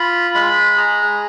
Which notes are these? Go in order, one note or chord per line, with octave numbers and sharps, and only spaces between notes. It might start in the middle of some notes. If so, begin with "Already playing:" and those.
Already playing: F4 B5
G#3 B5
G#4 A#5